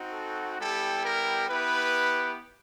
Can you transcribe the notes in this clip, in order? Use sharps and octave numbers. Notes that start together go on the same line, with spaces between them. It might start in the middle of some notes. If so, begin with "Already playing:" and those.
Already playing: C4 D#4 F#4
A4
G3 B3 E4 G4 A4
A#4
B3 E4 G4 B4